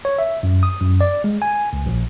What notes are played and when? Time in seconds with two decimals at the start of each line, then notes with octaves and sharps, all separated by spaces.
0.05 C#5
0.18 E5
0.43 F#2
0.63 D#6
0.81 F#2
1.01 D5
1.24 G#3
1.42 G#5
1.73 C#2
1.86 A#1